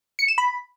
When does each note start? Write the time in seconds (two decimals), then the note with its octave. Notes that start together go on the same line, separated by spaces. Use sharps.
0.19 C#7
0.28 E7
0.38 B5